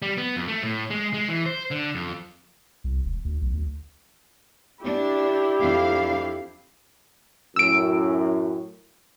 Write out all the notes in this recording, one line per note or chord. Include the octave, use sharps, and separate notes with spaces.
G3
B3
F2
A3
A2
G#3
G#3
E3
C5
D3
F2
C2
E1
D2
B1
D2
D4 E4 G4
F2 D4 F5
F#2 A2 E6 D7